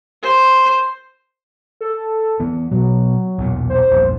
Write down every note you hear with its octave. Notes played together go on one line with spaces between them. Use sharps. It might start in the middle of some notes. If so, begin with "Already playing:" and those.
C5
A4
E3 B3
B2 F#3
B1 E2 A#2
C5
A#1 E2 G2